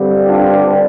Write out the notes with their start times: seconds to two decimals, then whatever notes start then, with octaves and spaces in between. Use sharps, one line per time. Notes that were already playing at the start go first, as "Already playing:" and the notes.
Already playing: G2 D3 G3 C4
0.27 D4 F4